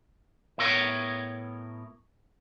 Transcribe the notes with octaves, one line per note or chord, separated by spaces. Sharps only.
A2 B3 E4 A#4 C#5